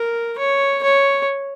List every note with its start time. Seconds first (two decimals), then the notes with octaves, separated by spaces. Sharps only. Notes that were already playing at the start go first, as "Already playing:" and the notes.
Already playing: A#4
0.38 C#5
0.83 C#5